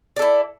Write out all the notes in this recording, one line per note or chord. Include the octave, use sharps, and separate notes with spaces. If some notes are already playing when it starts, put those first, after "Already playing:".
E4 A4 D5